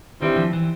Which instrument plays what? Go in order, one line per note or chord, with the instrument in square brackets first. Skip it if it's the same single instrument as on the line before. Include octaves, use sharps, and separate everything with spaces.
[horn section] G2 E3 G3 C4 [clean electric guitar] D#3
[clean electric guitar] F3
E3